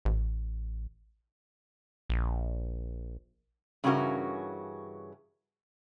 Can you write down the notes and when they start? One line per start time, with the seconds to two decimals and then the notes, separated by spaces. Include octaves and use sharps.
0.05 A1
2.10 A#1
3.84 G2 C#3 E3 C#4 F#4 A#4